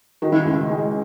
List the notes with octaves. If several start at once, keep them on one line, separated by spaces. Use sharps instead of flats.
D#3 F#4
E4
C#2
E4
G#3